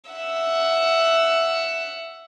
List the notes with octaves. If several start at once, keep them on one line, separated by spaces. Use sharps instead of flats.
E5 F#5